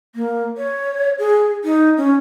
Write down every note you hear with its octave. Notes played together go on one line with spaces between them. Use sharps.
A#3
C#5
G#4
D#4
C#4